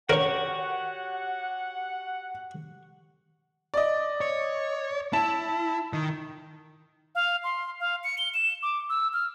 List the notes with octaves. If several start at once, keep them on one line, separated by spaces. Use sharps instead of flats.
F#4 G4 A#4 C#5 F#5 C#6
D5 D#5
C#5
E4 A5
D#3
F5
C6
F5
C#7
G7
E7
D6
E6
F6